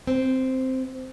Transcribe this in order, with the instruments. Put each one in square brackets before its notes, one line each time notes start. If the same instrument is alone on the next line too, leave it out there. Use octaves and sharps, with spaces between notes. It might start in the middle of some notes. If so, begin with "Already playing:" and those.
[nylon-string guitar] C4